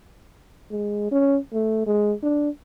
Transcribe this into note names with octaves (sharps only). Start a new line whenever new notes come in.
G#3
C#4
A3
G#3
D4